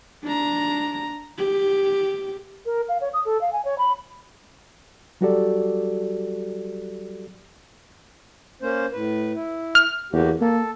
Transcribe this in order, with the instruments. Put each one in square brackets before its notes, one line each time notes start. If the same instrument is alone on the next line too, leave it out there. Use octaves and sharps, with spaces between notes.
[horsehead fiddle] D4 A#5
G4
[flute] A#4
F5
C#5
D#6
A4
F5
G#5
C#5
B5
[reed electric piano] F#3 G3 F#4 G4 A4 D5
[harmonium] A#3 C#4 C5
A2 B4
E4
[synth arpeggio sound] F6
[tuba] E2 [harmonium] A#3 F#4 G4
[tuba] A#3 [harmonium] A4